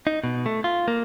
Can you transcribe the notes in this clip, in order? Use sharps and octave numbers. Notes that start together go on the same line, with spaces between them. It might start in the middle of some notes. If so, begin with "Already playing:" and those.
D#4
B2
A3
F4
A#3